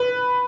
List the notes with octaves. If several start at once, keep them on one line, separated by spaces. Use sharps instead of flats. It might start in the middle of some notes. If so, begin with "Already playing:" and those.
Already playing: B4